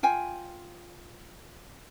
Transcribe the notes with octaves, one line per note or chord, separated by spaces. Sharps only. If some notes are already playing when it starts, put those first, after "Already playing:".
F4 G5 G#5